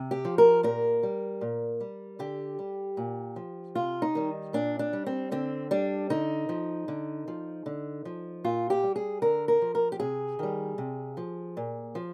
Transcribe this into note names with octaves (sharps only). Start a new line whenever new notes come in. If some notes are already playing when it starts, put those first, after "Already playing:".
Already playing: C3
G4
F3
A#4
A#2 A#4
G3
A#2
G3
D3 G4
G3
A#2
F3
C3 F4
D#4
D#3 G3
A#2 D4
D4
G3
C4
D3 C4
G3 D4
D3 D#4
F3
D3
F3
D3
F3
A#2 F4
G4
G3
G#4
D3 A#4
A#4
F3
A#4
G4
C3 G#4
D#3 G3
C3
F3
A#2
F3